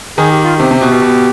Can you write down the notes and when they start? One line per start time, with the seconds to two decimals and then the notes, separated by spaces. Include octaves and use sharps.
0.18 D#3 G#4
0.31 G4
0.44 F4
0.57 C3 G4
0.71 C3
0.81 B2
0.92 B2
1.02 B2